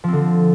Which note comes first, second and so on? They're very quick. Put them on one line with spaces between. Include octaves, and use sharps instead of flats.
F3 C4 D3